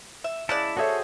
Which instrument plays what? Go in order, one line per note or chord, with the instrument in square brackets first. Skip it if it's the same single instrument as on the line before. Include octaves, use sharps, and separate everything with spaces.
[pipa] E5
[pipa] C#3 G#3 D5 [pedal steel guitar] E4 A5
[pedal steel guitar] F#4 G#4 C5 [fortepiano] A4 C#5 E5